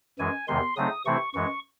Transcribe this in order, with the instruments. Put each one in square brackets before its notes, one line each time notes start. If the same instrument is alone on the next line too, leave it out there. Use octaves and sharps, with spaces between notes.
[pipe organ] F#2 E3 G#3 G#5
E2 C3 D#3 G#3 C6
C#3 F#3 A3 C4 D#4 D#6
C3 E3 A3 C4 E4 C#6
F#2 E3 G#3 C#6